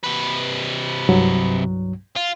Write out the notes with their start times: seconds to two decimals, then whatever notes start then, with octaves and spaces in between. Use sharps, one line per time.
0.03 C3 B4
1.09 C2 G2 F#3
2.16 F4